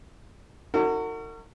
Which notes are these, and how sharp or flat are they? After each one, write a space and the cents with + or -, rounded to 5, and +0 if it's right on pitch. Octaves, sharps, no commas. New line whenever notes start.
D#4 +30 F#4 +0 A#4 -45